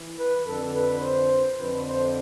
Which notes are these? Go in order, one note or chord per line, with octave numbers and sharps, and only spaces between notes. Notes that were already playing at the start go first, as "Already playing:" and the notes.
Already playing: E3
B4
F2 D3 A4
B4
C5
F2 D3 B4
C5